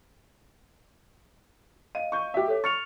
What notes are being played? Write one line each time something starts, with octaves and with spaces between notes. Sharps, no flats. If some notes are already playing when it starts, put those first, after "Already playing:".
D#5 F5 D#7
C#6 G6
G4 E5
A4 C#5
C#6 F6 A6 C#7 F7